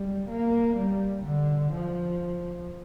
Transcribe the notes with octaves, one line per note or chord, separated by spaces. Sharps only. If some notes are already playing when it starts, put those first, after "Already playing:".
Already playing: G3
A#3
G3
D3
F3